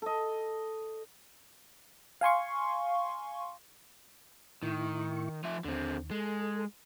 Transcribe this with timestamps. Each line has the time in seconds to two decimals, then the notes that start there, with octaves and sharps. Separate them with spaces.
0.02 A4 D#5
2.21 F5 G#5 C6 C#6
4.63 A2 D#3 E4 C#6
5.43 F3 E5
5.64 D#2 D3 C4
6.11 G#3 A4